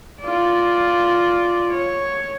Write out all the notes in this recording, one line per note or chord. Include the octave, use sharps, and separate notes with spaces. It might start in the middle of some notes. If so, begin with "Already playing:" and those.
F4 D5
C#5